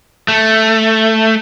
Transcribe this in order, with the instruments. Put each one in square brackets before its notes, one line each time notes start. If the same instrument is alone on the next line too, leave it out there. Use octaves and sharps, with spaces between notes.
[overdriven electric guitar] A3